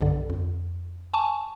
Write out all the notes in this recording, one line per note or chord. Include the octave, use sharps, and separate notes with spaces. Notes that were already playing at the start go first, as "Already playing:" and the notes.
B1 G2 D3
F2
G#5 A5 C#6